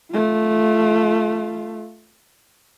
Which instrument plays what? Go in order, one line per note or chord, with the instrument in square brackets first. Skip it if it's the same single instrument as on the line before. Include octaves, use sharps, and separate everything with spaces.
[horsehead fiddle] A3 F4